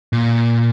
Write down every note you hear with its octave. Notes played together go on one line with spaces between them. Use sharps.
A#2